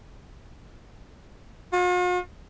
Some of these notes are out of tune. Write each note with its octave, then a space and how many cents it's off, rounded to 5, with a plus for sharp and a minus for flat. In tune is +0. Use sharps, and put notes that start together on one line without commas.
F4 +45